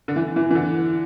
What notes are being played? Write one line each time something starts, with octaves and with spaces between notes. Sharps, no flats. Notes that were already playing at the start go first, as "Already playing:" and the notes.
D3
E3
E3
E3
D3